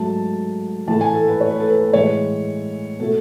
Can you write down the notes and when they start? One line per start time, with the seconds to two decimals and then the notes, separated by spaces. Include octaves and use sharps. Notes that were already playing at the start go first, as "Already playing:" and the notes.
Already playing: G#2 F#3 A3 A5
0.88 A2 E3 A3 A5
1.01 G#5
1.13 A4
1.28 B4
1.41 C#5
1.51 B4
1.60 A4
1.70 B4
1.93 A2 E3 G#3 C#5
2.99 B2 A3 A4